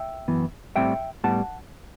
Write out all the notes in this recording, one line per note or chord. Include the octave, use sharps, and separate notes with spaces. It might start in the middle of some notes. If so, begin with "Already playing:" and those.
Already playing: E5 G5
F#2 E3 B3
A2 G3 C4 E5 G5
A2 G3 B3 F#5 A5